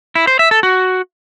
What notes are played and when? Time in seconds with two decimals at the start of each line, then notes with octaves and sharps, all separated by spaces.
0.15 E4
0.27 C5
0.39 E5
0.51 A4
0.63 F#4